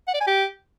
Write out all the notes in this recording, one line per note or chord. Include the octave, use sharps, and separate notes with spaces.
F#5
D5
G#5
G4